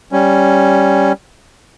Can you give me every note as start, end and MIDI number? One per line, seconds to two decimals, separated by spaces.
0.12 1.12 55
0.12 1.12 61